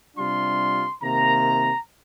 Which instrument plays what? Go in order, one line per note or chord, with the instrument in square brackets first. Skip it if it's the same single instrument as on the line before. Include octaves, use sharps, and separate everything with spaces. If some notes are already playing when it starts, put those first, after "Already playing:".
[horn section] C3 G3 D4 F4 C6
C3 D#3 A#3 A#5